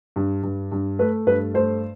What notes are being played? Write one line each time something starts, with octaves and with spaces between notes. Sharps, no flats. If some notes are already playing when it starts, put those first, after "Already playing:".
G2
G2
G2
A3 B4
G2 B4
A3 C5